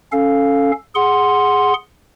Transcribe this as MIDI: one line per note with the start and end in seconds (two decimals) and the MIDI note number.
0.12 0.72 61
0.12 0.72 69
0.12 0.72 77
0.95 1.74 68
0.95 1.74 78
0.95 1.74 84